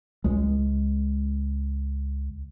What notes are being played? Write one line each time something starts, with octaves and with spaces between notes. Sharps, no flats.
C#2 G#3